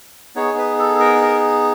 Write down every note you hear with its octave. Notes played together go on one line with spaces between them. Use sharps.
B3 D#4 G#4 C#5
B4
A4
A#4
A#4